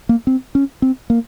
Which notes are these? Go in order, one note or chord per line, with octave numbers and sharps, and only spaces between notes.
A#3
C4
C#4
C4
A#3